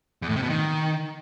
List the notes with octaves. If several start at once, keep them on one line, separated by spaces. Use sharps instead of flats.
E2
A2
C3
B2
D#3